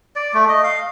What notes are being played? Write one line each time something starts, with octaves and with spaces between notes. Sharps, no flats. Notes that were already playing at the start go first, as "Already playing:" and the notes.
D5
A3
D#5
F5